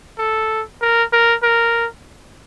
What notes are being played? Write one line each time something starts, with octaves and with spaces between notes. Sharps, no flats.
A4
A#4
A#4
A#4